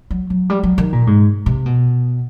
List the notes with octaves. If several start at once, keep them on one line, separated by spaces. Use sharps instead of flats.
F#3
F#3
G3
F#3
D#3
A#2
G#2
C3
B2